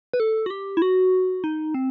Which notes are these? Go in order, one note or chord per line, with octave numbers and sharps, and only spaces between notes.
B4
A4
F#4
G4
E4
F#4
D#4
C4